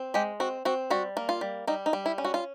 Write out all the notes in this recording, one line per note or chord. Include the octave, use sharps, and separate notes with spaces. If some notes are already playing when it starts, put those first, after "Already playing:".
Already playing: C4
G#3 G4
C4 F#4
C4 F#4
G3 F#4
A#3
F4
G3
G3 D#4
D#4
G3
E4
C#4
F#4
F4